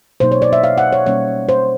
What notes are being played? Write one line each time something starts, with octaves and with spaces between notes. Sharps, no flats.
B2 F#3 A#3 D#4 C5
C#5
D5
E5
F5
F#5
C#5
B2 G3 A#3 C#4 C#5
C5